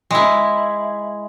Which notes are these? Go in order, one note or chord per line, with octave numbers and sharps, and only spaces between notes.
G#3 E4